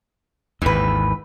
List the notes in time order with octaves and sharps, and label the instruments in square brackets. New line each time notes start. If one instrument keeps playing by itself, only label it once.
[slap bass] G#1 D#2 [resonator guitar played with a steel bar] E3 B4